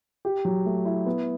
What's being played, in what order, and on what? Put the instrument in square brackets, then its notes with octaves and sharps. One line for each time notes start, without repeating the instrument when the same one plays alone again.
[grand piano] G4
F#3
A3
E4
B3